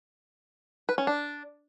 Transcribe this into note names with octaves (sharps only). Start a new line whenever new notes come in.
B4
C#4
D4